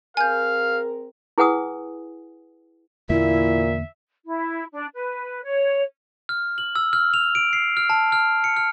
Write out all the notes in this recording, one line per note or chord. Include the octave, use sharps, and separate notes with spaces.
C4 G#4 A#4 F5 G#5 G6
E4 G#4 B4 F#5 G#5 D#6
E2 A#2 D3 A#3 E4 E5
E4
D4
B4
C#5
F6
F#7
E6
F6
F7
D7
C7
F6
A5
F6
C#7
F6